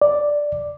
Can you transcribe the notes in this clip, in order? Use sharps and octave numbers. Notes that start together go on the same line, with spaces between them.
D5